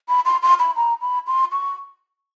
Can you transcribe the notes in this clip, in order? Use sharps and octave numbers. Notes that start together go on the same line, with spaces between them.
B5
C6
C6
B5
A#5
B5
C6
C#6